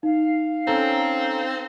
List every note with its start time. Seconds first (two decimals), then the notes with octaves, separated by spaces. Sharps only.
0.03 D#4 F5
0.67 C4 C#4 A4 A#5